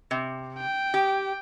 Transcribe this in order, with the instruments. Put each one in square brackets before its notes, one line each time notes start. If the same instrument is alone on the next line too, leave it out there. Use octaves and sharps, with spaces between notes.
[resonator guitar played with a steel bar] C3
[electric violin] G5
[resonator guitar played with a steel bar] G4